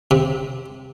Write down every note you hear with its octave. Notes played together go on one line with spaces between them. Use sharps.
C3